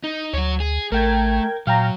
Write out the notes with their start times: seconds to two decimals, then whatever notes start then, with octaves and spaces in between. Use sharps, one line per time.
0.04 D#4
0.33 D2 F#3 C#5
0.60 G#4
0.92 A1 A3 A#4 G5 G#6
1.67 A#2 F#3 F5 G5 A#5